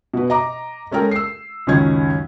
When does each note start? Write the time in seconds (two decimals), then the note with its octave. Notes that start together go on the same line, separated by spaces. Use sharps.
0.14 B2 B4
0.30 D#5 A#5 D6
0.91 G#3 C#4 A4 A#4 G5
1.11 E6 C7
1.67 C#2 F#2 D#3 C#4 G#6